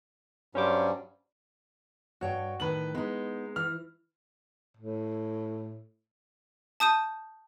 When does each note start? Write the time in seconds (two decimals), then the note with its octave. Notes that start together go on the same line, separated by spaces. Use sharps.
0.55 G2 F#3 G3 C#4 C5 D6
2.21 G2 F#4 C#5 G5
2.60 A2 D#3 B4 F#7
2.95 G#3 B3 D#4
3.56 E3 F6
4.77 A2
6.80 A5 D#6 G6 D#7